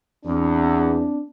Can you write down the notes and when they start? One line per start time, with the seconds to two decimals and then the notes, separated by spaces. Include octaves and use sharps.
0.25 E2 C4 D4